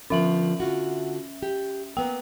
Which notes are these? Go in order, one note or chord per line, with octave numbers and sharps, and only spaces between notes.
D3 F3 B3 C#4 E5 F#7
D3 F4 F#4
G4
A#3 B3 A#4 G5